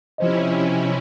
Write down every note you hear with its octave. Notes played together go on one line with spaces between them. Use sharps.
C3 F3 C#4 E4 C5 D#5